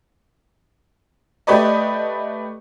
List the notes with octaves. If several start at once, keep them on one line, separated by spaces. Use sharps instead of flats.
A3 G4 B4 D5 D#5